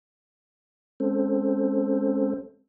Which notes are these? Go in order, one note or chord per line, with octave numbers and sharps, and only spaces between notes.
G#3 C4 C#4 A4 C5